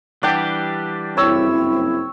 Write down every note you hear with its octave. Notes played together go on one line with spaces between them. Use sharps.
E3 G3 D4 G4 F#5 G5
F#1 G2 C4 E4 C#5 E6